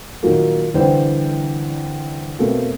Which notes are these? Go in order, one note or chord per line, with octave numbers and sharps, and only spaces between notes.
A#2 D#3 F3 F#3 A#3
C2 D3 E3 G3 C5 G5
B2 A3 A#3 C4